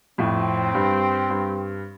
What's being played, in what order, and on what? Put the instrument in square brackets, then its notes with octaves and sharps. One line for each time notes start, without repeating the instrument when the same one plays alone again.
[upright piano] F2 A2 [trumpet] C4
[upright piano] G2
G2